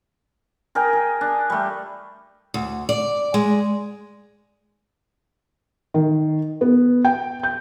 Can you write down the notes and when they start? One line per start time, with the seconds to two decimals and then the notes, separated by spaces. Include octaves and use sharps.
0.75 G#4 A#4 D#5 G5
0.93 G#4
1.21 D4
1.50 G3 A3
2.54 D2
2.89 D5
3.34 G#3
5.94 D#3
6.61 B3
7.05 G5
7.43 G6